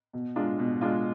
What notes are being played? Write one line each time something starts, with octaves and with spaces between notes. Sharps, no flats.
B2
G#3 D4 F4
B2
G#3 D4 F4